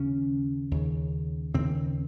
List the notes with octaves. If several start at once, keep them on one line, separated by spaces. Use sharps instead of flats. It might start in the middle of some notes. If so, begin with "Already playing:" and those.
Already playing: D#2 C#3 C#4
D#2 C#3
D#2 C#3 C4